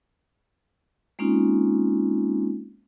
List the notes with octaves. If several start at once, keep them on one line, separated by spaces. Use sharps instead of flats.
G#3 A#3 C4 C#4 D#4 F4